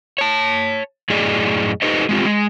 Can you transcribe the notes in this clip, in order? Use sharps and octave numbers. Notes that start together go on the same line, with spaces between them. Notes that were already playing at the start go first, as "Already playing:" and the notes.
C#5 A5
F#2 A2 G#4 D5 D#5
D#4 G4 A4 B4 C5 D#5
G#3 C4 F4 G4
G#3